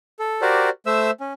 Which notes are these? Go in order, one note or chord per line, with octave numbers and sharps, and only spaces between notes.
A4
F#4 G4 A#4 C5 D5
A3 C5 E5 E6
C#4